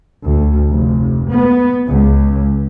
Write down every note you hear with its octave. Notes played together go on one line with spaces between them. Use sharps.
D2
F1
B3
C#2